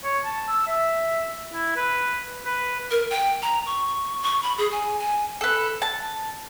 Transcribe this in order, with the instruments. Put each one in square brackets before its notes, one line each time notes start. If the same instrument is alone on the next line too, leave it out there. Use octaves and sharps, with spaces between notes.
[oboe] C#5
A5
E6
E5
E4
B4
B4
[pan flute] A#4
G5
A#5
C#6
C#6
B5
G#4
G#5
G#5
[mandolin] A4 B4
A5